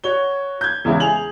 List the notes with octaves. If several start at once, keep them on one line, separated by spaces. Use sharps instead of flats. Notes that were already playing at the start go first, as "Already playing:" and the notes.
F#4 C#5 G7
G6 G#6
E2 C#3 G#3 E4
G#4 F7 F#7